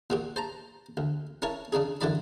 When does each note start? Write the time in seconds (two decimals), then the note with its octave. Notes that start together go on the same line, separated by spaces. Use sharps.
0.10 A#2 F#4 G4
0.36 C5 A5 A#5
0.97 D2
1.42 C#4 E4 A#4 C#5 A5
1.72 C#3 D4 D#4 G#4
2.01 F#2 D3 E3 E4 D5 B5